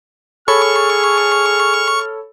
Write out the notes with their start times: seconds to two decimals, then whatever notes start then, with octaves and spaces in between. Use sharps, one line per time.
0.48 G#4 A4 C#5 B5 C#6 F6